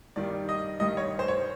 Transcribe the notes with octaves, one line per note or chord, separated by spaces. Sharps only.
G2 D#3 G3 D5
D#5
G2 D#3 G3 D#5
C#5
C5
C#5